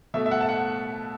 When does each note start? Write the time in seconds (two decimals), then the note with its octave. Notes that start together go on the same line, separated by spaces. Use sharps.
0.14 B2 A3 E5
0.26 E5
0.31 F#5
0.41 A5
0.49 F#5